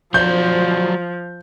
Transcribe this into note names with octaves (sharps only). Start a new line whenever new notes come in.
F3 F#3 C5 D5 G6